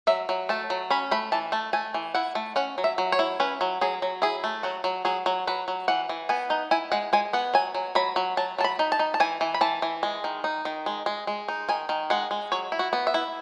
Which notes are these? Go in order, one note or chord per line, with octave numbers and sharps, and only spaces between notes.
F#3 E5
F#3
A3 A5
F#3
C#4 B5
A3 B5
E3 A5
A3 A5
A3 G#5
E3
E4 F#5
A3
C#4 F#5
F#3
E5
F#3
C#5
E4
C#4 B4
F#3
F#3 G#4
F#3
E4 G#4
A3
F#3 F#4
F#3
F#3 G#4
F#3
F#3 B4
F#3
E3 F#5
E3
B3 G#5
D#4
E4 G#5
G#3 F#5
G#3 G#5
B3 F#5
F#3 G#5
F#3
F#3 B5
F#3
F#3 A5
F#3 A5
B5
D#4
A5
D#4
A5
E3 G#5
E3
B5
E3 A5
E3
G#3
D#3
D#4
D#3
G#3
G#3
G#3
D#4
D#3 G#5
D#3
G#3 F#5
G#3
F#3 C#5
E4
F#4
B3
E5
E4